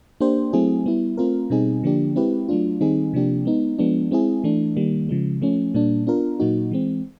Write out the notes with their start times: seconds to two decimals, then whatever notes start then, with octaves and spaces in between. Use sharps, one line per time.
0.20 A#3 D4 G4 C5
0.53 F#3 A3 C4 E4 G#4
0.86 G3 B3 E4
1.18 A3 C4 F4 A#4
1.50 B2 G3 C4 D#4 G#4
1.83 D3 F3 A#3 D4 G4
2.16 G#3 C4 E4 G4 B4
2.48 F#3 A3 D4 F4
2.81 D#3 G3 C4 D#4 G#4
3.13 C3 F3 A#3 D4 G4
3.45 G#3 B3 D#4
3.78 F3 G#3 B3 D4
4.11 G#3 C4 E4 G#4
4.44 E3 A3 D4
4.76 D#3 G3 A#3
5.09 C#3 F3 G#3
5.42 F3 A3 C#4
5.74 A#2 G3 A#3 D4
6.07 B3 D4 F4 A#4
6.40 A#2 F#3 A#3 D#4 F#4
6.71 E3 G#3 C4